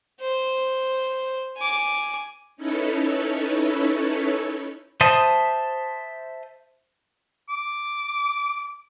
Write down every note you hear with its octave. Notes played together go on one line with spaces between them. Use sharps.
C5
G#5 D6
C#4 D#4 E4 A4 B4 C#5
C5 E5 A5 C6 D#6
D6